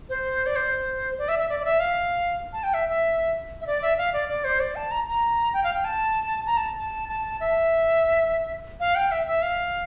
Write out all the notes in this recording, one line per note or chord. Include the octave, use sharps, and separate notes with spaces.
C5
D5
C5
D5
E5
E5
D5
D5
E5
F5
A5
G5
E5
E5
E5
D5
E5
F5
D5
D5
C5
D5
A5
A#5
A#5
G5
F5
G5
A5
A#5
A5
A5
A5
E5
F5
G5
E5
E5
F5